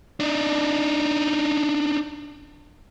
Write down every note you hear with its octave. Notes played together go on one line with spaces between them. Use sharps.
D4 D#4